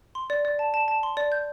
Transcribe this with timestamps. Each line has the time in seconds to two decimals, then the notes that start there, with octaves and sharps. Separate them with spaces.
0.15 C6
0.30 D5
0.45 D5
0.59 A5
0.74 A5
0.88 A5
1.03 C6
1.17 D5
1.32 G6